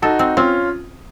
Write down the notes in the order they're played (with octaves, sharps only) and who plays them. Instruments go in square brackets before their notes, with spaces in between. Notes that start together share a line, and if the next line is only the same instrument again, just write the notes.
[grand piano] D#4 F#4 [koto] A4
[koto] C4
[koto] C4 [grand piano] C#4 F4